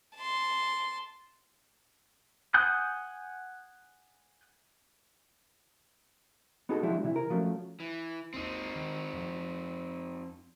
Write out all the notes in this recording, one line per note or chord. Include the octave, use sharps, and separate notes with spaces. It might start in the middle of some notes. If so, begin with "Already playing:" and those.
A5 C6
F#5 G#5 D#6 F#6 G6
B3 D#4 F#4 G#4 A4
F3 F#3 G#3 D4 E4 G4
C3 E3 E4
A#4
F3 F#3 A3 C#4
E3
G#1 D#2 C4 D#4
D#3
F2 F3